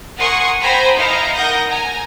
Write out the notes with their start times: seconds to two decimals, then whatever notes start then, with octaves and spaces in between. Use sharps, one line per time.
0.18 A#4 F#5 G#5 C6 C#6 D#6
0.60 C5 G5 G#5 A#5 B5
0.95 D#4 E4 F5 A#5
1.33 A#4 F#5 D#6 G6 A#6
1.68 G#5 A#5